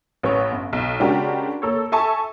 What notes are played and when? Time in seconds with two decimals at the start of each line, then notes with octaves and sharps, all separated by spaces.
0.23 A1 B4 C#5
0.51 G1
0.73 B1
1.00 C#3 G#3 D4 F#4 G4 A#4
1.62 A#3 A4 C#5
1.92 A4 E5 G#5 A5 C#6